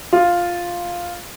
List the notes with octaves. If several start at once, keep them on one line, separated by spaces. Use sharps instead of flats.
F4